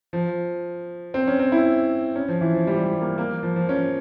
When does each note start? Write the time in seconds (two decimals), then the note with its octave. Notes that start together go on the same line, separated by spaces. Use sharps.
0.13 F3
1.14 C4
1.27 C#4
1.39 C4
1.52 E4
2.16 C#4
2.28 F3
2.41 E3
2.54 F3
2.67 G3
2.84 G3
3.01 A#3
3.18 A#3
3.43 F3
3.56 F3
3.69 C#4